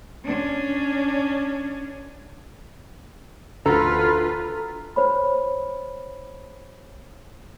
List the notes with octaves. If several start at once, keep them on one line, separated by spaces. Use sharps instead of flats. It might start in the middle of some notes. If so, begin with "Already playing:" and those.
C#4 D4
D2 F4 A4 B4 A#5
C5 C#5 B5